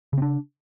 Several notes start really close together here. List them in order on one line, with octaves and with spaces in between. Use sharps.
C#3 C4 D4